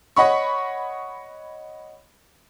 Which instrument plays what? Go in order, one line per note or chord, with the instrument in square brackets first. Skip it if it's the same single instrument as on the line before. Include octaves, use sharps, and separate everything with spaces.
[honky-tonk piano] C#5 D#5 F#5 B5 C#6